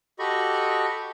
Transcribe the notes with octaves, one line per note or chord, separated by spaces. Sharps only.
F#4 G4 A4 D#5 B5 C#6